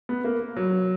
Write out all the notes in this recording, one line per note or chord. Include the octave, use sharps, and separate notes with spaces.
B3
A#3
F#3